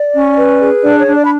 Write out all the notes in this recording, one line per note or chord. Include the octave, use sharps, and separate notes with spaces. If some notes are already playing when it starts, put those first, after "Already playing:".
Already playing: D5
C#4
B4
G#4
D4 D5
C#5
D4
D5
B5